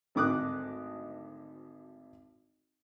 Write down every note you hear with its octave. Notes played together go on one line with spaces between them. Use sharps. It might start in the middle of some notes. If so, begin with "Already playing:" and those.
G#1 D2 D#4 D6 D#6 F#6